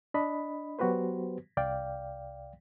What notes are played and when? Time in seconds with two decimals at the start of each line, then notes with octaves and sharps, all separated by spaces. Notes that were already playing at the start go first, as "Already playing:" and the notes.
0.14 D4 D#5 B5
0.79 F#3 B3 F#4 G4 B4 C5
1.57 C2 D5 F5 G5